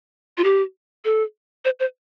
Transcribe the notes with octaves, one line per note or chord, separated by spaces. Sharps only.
F4
G4
A4
C5
C5